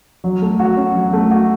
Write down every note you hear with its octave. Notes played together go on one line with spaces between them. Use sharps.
F#3
A3
F#4
C#4
F#3
A3
F#4